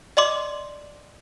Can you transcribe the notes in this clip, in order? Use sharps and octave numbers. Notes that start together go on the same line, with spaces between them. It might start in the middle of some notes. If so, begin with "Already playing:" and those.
D5 D#5 C6 D6